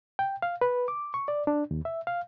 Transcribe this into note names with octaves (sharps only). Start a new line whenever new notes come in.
G5
F5
B4
D6
C#6
D5
D4
D#2
E5
F5